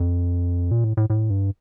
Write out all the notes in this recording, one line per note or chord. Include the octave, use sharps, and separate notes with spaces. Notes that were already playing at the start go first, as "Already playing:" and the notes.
Already playing: F2
A#2
A2
A2
A2
G2